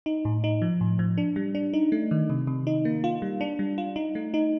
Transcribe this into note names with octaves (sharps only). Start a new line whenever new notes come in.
D#4
A2
D#4
F3
A2
F3
D4
G3
D4
D#4
A3
D#3
C3
C3
D#4
A#3
F4
G3
D4
G3
F4
D#4
A3
D#4